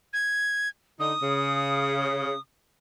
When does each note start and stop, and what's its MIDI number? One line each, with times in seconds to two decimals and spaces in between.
0.13 0.69 92
1.00 1.14 50
1.00 1.14 63
1.00 2.40 87
1.23 2.34 49